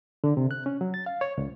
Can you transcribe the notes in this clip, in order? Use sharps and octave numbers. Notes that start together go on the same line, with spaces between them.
D3
C3
F#6
C#4
F#3
A6
F5
C#5
C#2